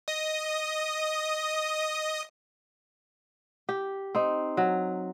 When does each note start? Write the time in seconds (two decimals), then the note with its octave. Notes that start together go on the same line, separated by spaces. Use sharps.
0.08 D#5 D#6
3.69 G4
4.15 C4 D#4
4.57 F#3